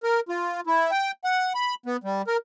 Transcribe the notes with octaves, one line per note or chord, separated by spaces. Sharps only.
A#4
F4
E4
G5
F#5
B5
B3
G3
A#4